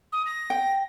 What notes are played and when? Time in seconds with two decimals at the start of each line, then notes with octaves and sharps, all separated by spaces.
0.12 D#6
0.26 A#6
0.50 G5